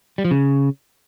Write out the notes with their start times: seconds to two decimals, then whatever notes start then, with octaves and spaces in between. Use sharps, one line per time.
0.18 G3
0.25 F3
0.31 C#3